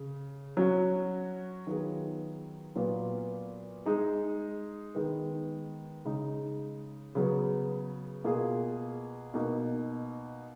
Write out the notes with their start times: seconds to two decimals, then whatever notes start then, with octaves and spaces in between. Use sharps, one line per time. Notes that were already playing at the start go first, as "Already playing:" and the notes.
Already playing: C#3
0.57 F#3 C#4 F#4
1.67 D#3 F#3 B3 F4 G#4
2.75 A#2 F#3 B3 F4
3.85 G#3 D#4 G#4
4.95 D#3 G#3 B3
6.05 C#3 G#3 D#4
7.15 C#3 F#3 B3
8.24 B2 A#3 F4 G#4
9.34 B2 A#3 D#4